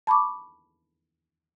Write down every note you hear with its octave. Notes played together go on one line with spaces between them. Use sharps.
A5 B5 C#6 D6